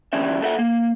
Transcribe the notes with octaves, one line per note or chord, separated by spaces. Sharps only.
F2 D3 E3 G3 C#4 E5
A#2 A4 E5 F#5
A#3